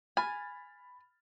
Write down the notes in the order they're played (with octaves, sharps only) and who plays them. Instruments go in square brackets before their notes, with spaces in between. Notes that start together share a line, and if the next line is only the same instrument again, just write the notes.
[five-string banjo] G#5 [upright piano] B5 F6 A6